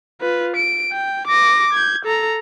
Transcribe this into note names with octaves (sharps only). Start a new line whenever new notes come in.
F4 B4
D7
G5
D6 A#6
G6 G#6
A4 A#5